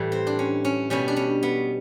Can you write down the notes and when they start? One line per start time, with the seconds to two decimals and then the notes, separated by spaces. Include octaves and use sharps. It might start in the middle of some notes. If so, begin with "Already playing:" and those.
Already playing: A2 E3 G3
0.12 C4
0.27 D4
0.39 C#4
0.65 C#4
0.90 B2 G3 C#4
1.08 D4
1.16 C#4
1.43 B3